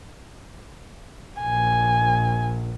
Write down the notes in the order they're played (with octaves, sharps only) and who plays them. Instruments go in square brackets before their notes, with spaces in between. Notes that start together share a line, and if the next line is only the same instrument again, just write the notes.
[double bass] A#1 [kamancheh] G#5